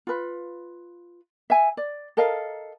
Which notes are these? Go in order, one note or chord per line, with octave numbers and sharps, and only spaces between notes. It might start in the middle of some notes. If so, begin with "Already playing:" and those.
F4 B4
E5 G#5
D5
A4 A#4 D#5 F5